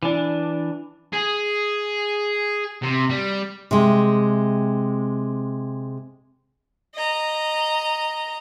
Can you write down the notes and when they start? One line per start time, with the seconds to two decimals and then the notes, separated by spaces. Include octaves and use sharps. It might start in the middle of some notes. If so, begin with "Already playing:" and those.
0.03 E3 D4
1.13 G#4
2.82 C3
3.10 G3
3.71 C3 G#3
6.95 D#5 A#5